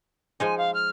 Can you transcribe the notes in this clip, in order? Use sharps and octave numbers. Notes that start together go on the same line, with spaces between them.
F3 G#3 D#4 G#5
F5
F6